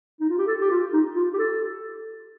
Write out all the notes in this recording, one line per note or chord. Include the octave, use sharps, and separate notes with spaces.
D#4
F4
G4
A4
G4
F4
D#4
F4
G4
A4